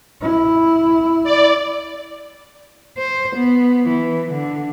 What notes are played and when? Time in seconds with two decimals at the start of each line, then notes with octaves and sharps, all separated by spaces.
0.22 E4
1.24 D5
2.97 C5
3.34 B3
3.86 E3
4.30 D3